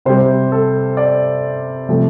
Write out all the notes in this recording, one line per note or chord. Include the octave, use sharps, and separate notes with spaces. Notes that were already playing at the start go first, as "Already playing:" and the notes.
C3 G3 C5
A4
D5
C3 F3 A3